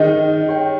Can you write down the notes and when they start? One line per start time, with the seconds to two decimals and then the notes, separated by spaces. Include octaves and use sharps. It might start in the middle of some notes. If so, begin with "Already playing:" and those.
Already playing: D#3 D#4 G#4 C5 D#5
0.48 G4 C#5 G5